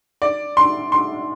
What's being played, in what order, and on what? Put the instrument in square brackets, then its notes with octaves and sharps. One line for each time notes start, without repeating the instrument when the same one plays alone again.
[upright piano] D5
C6
C6